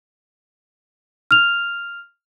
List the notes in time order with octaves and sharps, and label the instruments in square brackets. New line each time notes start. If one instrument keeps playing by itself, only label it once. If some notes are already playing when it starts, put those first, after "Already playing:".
[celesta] F6 F7